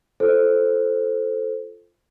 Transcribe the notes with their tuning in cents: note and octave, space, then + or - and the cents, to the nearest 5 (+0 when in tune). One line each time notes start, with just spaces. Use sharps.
F4 -10 A4 +0 C5 +0